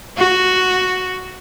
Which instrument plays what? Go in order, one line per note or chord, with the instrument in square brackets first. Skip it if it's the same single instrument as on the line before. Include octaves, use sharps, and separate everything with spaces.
[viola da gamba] F#4